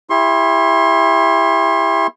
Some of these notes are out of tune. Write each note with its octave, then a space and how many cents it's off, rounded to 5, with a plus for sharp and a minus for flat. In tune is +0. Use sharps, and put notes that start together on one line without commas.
E4 +10 G4 +30 C6 +35